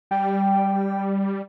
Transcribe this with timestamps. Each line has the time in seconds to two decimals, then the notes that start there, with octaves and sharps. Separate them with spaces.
0.11 G3 G5